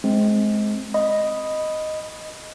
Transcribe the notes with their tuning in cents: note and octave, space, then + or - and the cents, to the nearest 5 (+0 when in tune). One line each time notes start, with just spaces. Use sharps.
G#3 +25 C4 +0
D#5 +0 B5 +0